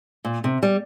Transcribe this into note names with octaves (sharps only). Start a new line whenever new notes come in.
A#2
C3
G3